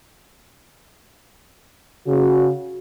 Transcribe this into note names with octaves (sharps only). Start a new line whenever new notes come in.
C#3 F#4